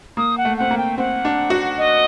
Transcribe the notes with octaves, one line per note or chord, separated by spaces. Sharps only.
A#3 D#6
F#5
A3
C4 F#5
A#3
G5
C4 F#5
D4
F#4
D#5